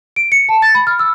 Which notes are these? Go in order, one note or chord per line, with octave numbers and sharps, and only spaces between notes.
D7
C#7
A5
A6
B5
F6
E6